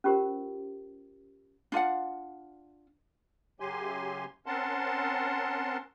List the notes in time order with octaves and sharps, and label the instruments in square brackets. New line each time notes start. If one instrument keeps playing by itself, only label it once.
[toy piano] C#4 F4 G4 A#4 C5
[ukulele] D4 F4 F5 F#5
[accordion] F#2 C#3 F#3 G4 G#5 C6
C4 C#4 A#4 F#5 A5 C6